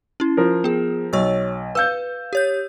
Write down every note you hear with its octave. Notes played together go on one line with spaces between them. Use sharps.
C#4 E4
F3 A#4
B3 G#4
B1 C#5 C#6 E6
B4 F5 E6 G6
G4 C#5 G6